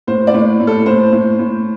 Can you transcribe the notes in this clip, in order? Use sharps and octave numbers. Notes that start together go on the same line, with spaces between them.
A2 C5
D5
A2
A2
A4
A2 C5
A2
A2